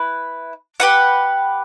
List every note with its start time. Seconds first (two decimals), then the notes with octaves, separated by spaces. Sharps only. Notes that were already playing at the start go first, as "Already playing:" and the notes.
Already playing: E4 B4
0.80 G4 B4 F#5